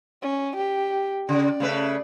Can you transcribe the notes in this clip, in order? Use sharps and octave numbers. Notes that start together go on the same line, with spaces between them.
C#4
G4
C#3 D5
C#3 A3 B4